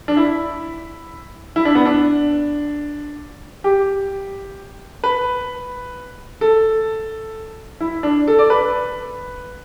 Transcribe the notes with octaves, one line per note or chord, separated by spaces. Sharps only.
D4
E4
E4
D4
B3
D4
G4
B4
A4
E4
D4
A4
D5
B4